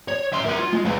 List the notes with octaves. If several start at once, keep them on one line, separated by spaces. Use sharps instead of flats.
C#5
E5 C6
A#4 F#5
F4
G#3
G#3 B4